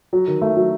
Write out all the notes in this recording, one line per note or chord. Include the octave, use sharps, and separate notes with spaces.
F#3
D#3
A3
F#3